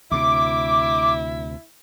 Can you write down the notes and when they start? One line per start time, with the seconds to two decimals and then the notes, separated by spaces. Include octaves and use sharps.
0.12 D2 C3 E4 D6